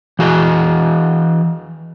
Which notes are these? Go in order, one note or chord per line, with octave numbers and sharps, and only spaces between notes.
E3 F#4 G#4 D#5